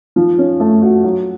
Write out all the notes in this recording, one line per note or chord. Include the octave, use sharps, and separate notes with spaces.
F3
C#4
A3
F#4
F#3